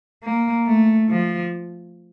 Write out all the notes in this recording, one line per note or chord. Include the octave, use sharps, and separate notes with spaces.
A#3
A3
F3